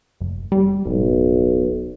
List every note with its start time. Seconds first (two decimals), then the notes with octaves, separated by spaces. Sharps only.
0.21 F#1
0.52 G3
0.86 D1 B1